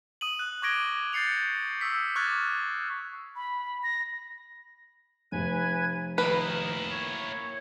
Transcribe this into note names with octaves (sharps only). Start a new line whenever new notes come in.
D#6 D#7 F#7
F#6
C#6 D6 G#6 A#6 D7 G7
G6 A6 C7 C#7 F7
C#6 D#6 E6 B6
C#6 D6 F6 F#6 G#6 A6
B5
A#6
F1 B4 G#5 G#6
D#3 A#3 E4 B4
C#5